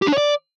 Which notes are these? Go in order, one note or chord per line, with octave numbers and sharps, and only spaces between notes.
G4
D4
C#5
D5